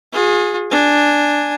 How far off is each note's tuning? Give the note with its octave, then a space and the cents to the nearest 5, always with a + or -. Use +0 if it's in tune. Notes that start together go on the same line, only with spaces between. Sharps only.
F4 +45 G#4 +0
D4 +0 G#5 +0